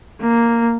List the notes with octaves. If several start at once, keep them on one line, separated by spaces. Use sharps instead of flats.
A#3